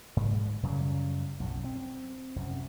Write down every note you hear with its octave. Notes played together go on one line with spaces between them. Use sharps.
G#2
F#2 C#3 F#3 G3
B1 F#2
C4
C2 F#2